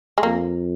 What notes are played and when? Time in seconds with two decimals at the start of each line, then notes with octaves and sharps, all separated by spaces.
0.18 G#3
0.23 F2 A#3